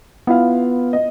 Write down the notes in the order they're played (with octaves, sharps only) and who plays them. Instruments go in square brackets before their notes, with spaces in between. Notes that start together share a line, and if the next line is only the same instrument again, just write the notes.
[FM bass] B3 [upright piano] E4 F4 F5
[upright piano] D#5